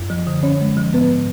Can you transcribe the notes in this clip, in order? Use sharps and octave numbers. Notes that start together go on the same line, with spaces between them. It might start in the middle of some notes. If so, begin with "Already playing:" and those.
Already playing: F#2
F3
D3
D3 C#4 C#5
G#3
F3
G#2 B3 B4